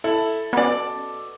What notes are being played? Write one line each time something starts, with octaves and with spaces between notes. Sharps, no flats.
E4 A4
B2 B3 C#4 D5